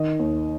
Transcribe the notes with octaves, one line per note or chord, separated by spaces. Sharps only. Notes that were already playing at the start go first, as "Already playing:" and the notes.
Already playing: D#3 D#5
D#2